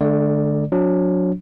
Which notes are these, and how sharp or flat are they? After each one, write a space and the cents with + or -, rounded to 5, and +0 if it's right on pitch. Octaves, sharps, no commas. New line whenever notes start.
D3 +0 A3 -45 D5 +0
F#3 -30 D4 -25